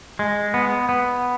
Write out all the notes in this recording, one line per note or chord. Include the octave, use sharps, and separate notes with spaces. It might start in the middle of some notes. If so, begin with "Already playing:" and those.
G#3
B3
B3